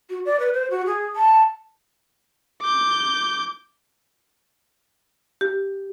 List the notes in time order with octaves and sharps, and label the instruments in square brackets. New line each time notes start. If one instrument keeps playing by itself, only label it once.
[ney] F#4
D5
B4
C5
F#4
G#4
A5
[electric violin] D6 G6
[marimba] G4